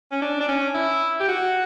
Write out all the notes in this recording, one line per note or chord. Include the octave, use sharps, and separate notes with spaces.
C#4
D4
D4
C#4
E4
G4
F#4